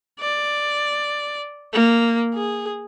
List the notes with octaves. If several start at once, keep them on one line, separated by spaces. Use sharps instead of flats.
D5
A#3
G#4